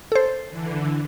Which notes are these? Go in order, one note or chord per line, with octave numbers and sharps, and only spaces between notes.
A4 C5
D3 E3